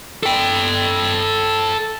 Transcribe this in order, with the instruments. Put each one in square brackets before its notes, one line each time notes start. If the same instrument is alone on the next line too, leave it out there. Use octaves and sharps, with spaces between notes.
[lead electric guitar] A4 G5